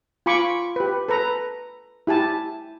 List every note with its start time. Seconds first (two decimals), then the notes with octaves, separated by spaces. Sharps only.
0.26 F4 G#5 B5 C#6 D6
0.76 G4 B4
1.08 A4 B4 A#5
2.07 E4 G4 G#5 A5